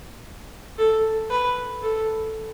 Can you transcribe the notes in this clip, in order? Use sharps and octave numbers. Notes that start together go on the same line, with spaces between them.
A4
B4
A4